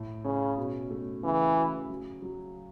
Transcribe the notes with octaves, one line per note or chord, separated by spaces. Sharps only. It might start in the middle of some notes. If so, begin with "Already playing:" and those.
Already playing: A2
C#3 C#4
B2
A3
C#3 E3
F#4
F#3
F#3